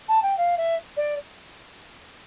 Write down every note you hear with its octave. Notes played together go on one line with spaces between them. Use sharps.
A5
G5
F5
E5
D5